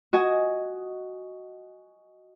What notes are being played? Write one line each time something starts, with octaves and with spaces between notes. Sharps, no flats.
F#4 D#5 G#5